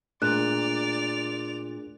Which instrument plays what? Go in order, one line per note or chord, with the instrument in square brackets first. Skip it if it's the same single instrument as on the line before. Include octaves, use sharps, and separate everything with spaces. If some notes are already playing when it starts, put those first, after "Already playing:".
[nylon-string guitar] A#2 [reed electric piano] A3 D4 G#4 [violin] D5 F7 [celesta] F#6